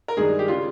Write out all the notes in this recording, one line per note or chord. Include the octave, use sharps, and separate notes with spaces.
A#4
G2 D#3 G#3 G#4
G4
C#3 G3 F4